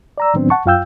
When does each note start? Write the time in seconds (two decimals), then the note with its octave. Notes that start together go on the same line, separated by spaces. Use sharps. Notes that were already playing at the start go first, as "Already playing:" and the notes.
0.18 D5 A#5 E6
0.34 A2 D#3 F#3 B3 C4 D4
0.50 F#5 A5 C#6
0.66 F#2 F4 F5 G5 E6 G6